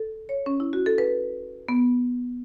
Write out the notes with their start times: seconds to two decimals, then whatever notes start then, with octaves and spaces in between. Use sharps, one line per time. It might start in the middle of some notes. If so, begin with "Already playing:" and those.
Already playing: A4
0.29 C#5
0.46 C#4
0.60 E4
0.73 F#4
0.86 A4
0.98 B4
1.68 B3